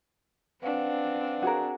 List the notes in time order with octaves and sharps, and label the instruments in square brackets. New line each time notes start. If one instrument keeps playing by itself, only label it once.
[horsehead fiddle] C4 D4 [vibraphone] B4 F5 F#5
[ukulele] F#4 G#4 A#4